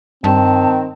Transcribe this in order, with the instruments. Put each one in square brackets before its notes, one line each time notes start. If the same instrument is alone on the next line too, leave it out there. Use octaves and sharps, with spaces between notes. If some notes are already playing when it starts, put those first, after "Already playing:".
[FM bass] G2 [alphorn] D#3 [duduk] C4 [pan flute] A5